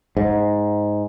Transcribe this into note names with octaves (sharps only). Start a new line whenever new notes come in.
G#2